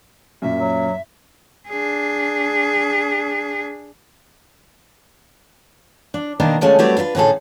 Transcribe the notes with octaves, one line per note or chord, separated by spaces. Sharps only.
F#2 A#2 E5
F#3
D4 G#4
D4
B2 D#3 A#3 D4 D#4 A#4
D3 F3 G#3 A3 C#4
F#3 G3 A3 C4 G4 B4
D4 F4 A#4 B4
A2 D3 B3 C#4 G#4 A4